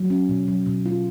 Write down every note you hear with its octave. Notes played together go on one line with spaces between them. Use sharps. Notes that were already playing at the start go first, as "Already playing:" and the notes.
Already playing: F#3
C#4
B2
F#3
B2
F4